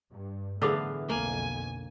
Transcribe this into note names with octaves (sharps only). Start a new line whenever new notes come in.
G2
A2 D3 E3 B3 G#4 F5 D6 E6
B1 F2 A#3 G#5